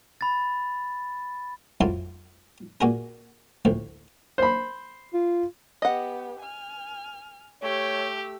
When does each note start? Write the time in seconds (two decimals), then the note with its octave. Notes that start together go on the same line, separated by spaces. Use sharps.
0.21 B5 A6
1.81 F2 F#3 E4 F4 A5 C6
2.81 A#2 F#4 G#4 A#4
3.65 D2 A2 F3
4.38 C5 B5
5.14 F4
5.82 B3 G4 D#5 F#5
6.40 G#5 F6
7.62 A3 G4 C#5 E6